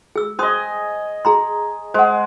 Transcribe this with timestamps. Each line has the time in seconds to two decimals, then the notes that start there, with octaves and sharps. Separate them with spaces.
0.16 G#4 E6
0.39 C5 D#5 G#5 C6 D#6
1.25 G#4 A#5 C6
1.94 G#3 C5 F#5